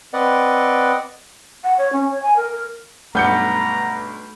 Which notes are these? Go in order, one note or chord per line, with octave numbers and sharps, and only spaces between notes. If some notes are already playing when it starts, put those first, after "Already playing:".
C4 B4 D5 D#5 F#5
F#5
C#5
C#4
C#5
G#5
A#4
A#4
B1 G2 A3 F#5 A#5 G6 C#7